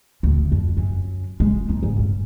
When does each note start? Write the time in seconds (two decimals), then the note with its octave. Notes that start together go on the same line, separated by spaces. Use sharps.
0.23 D2
0.52 F2
0.77 F#2
1.40 G#3
1.69 D#4
1.83 G#2
1.99 G2